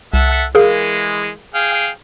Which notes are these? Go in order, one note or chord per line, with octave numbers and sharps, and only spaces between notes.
C2 A4 E5 F#5
E3 G#3 G#4 A#4 F5
G#4 F5 G5